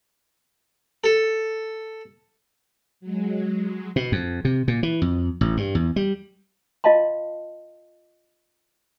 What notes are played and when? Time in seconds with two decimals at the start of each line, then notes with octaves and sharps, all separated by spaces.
1.04 A4
3.00 F#3 G#3
3.96 B2
4.12 F2
4.45 C3
4.68 A#2
4.83 E3
5.02 F2
5.41 A1
5.57 G2
5.75 E2
5.96 G3
6.84 F4 D#5 F5 A5 C6